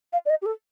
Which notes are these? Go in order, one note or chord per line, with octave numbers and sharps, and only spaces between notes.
F5
D5
D#5
G4
A4